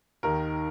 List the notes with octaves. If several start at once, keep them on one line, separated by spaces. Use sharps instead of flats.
D#2 D#3 A#4